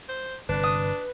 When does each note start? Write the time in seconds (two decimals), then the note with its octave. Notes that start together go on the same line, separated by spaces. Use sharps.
0.09 C5
0.49 G1 C3 D4 B4
0.64 D#6